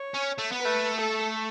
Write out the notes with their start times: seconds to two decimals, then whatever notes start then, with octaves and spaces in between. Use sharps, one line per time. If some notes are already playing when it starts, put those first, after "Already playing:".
Already playing: C#5
0.14 C#4
0.38 A3
0.52 B3
0.61 A3 B4
0.98 A4